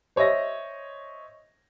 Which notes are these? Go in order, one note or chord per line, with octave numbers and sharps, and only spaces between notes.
C5 C#5 D#5 E5 A#6